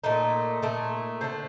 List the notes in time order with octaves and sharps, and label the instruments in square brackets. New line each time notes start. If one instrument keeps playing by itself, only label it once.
[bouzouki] A#2 A3 D#4
A#2 A3
D3 A3 C5